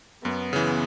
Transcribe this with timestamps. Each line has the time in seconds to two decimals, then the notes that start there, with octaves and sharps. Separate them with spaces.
0.25 F#2 B3
0.53 C#3 E3